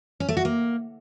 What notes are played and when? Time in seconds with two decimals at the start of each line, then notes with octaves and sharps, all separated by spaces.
0.20 C#4
0.29 A3
0.37 F#4
0.45 A#3